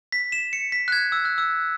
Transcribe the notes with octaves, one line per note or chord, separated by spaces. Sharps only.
B6
E7
C#7
B6
F#6
G#6
E6
F#6
E6